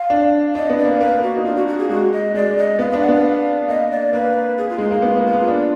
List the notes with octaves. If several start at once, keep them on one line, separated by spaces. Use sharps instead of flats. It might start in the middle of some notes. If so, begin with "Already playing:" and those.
Already playing: F5
D4
D4 D#5
B3
D5
A#3
A#3 B4
F#4
D#4
D4 F4
F#4
F#4
G#4
G#3 F#4
D#5
G#3 D5
D#5
B3 F5
D4 F5
F#5
B3 F5
A#3 D#5
D5
A#3 B4
G#4
F4
G#3 D#4
A#3 D#4
B3 F4
A#3
F4
B3
D4